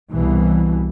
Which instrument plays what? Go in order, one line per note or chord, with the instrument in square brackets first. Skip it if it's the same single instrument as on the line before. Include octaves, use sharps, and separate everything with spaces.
[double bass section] C2 B2 E3